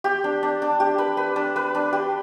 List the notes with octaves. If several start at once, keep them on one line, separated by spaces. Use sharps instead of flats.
G4
D4
D4
D4
G4
B4
B4
D4
B4
D4
G4